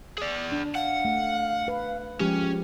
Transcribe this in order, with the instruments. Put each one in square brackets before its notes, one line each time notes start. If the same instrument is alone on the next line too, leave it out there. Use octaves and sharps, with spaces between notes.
[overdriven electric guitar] G#4 D5
[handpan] D4
[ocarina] F5 [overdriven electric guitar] F#5
[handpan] A3
B4
[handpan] F3 G#3 G4 [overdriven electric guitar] C#4